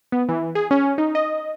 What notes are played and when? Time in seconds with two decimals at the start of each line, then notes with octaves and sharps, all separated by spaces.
0.12 B3
0.29 E3
0.55 G#4
0.71 C#4
0.98 D#4
1.15 D#5